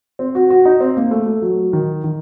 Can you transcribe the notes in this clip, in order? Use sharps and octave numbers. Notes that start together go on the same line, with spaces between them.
C4
F#4
F#4
D#4
C4
A#3
A3
A3
F#3
D#3
D#3